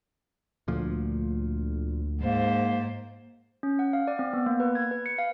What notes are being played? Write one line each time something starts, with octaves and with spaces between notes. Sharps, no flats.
D2 A#2 F3
G#2 A#3 C5
C#4
F#5
F5
D5
C4
B3
A#3
B4
G#6
B4
C#7
F5